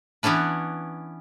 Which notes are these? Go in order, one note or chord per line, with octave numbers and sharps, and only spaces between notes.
E3 B3 C#4 D4 B4